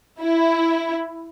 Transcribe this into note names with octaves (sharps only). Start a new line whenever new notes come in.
E4